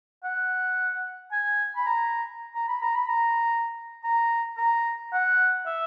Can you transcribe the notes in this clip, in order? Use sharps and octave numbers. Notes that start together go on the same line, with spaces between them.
F#5
G#5
B5
A#5
A#5
B5
A#5
B5
A#5
A#5
A#5
F#5
E5